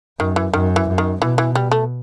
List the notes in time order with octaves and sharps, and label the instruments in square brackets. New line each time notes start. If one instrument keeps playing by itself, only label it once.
[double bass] F#2 [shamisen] D#3
[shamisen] E3
[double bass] F#2 [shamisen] D#3
[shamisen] E3
[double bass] F#2
[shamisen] D#3
[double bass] B2 [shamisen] E3
[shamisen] E3
G3
A3